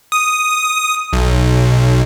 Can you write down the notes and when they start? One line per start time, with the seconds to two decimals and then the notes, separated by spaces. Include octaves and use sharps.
0.12 D#6
1.13 B1